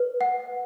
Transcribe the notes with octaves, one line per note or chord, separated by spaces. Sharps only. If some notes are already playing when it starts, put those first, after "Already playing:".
Already playing: B4
F#5